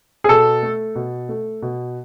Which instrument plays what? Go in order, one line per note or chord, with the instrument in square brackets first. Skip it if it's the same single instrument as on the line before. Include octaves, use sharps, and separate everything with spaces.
[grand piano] G#4
B2 A4
A3
B2
A3
B2